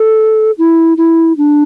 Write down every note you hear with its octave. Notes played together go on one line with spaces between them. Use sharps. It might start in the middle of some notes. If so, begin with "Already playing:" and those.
Already playing: A4
E4
E4
D4